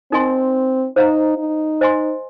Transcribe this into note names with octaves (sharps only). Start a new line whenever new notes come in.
C4 D#4 A#4 D#5 G#5 C6
D#4 C5 F5 A#5
D#4
C5 D#5 G#5 C6